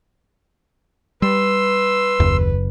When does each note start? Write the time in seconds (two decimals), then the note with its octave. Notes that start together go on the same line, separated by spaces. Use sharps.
1.22 G3 B4 C6 E6
2.20 F#1 D#2